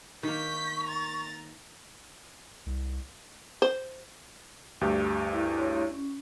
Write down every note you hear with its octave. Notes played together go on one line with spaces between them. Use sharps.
D#3 A#3 C#6 G6 B6
A#5 A6
C2
C5
D2 G2 G4
E4
E4 C#5 C6
C#4